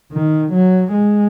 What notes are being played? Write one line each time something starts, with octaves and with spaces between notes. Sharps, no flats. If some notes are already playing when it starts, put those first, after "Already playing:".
D#3
F#3
G#3